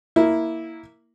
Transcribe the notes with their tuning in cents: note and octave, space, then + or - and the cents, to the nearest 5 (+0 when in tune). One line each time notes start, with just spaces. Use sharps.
A#3 +0 E4 -10